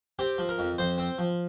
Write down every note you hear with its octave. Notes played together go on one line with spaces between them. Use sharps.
C4 G4
F3
A#4
F2
F2 C5
C4
F3